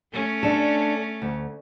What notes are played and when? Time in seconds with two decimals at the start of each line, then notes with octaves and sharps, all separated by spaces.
0.12 A3 C#4
0.43 D4 A4
1.22 D2